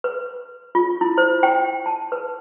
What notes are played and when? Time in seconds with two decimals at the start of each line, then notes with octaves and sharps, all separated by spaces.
0.04 B4
0.75 F4
1.01 E4
1.18 C5
1.43 G5
1.86 A5
2.12 B4